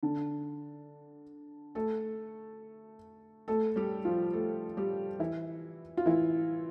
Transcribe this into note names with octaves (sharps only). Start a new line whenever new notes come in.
D3 D4
A3 A4
A3 A4
G3 G4
F3 F4
A3 A4
G3 G4
E3 E4
F4
E3 E4